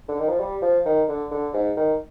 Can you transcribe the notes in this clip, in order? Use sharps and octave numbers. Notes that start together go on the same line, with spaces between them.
D3
D#3
F3
G3
F3
D#3
D3
D3
G#2
D#3